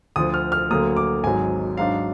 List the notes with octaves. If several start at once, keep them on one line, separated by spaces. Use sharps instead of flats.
D2 D3 F3 D#6
F6
F6
D2 D3 F#3 A#3 D#6
D6
G#1 G#2 F#3 G#5
G#2 F#3 D4 F5